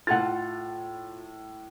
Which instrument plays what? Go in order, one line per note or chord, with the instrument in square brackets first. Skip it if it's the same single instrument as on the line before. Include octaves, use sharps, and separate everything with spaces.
[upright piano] A2 A6 [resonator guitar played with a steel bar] F4 A4 F#5